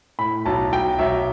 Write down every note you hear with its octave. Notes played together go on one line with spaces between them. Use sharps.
A2 B5
B1 A5
B1 G5
B1 E5